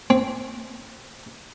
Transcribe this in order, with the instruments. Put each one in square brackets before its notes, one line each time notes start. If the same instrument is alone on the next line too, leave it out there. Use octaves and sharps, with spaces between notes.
[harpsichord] C4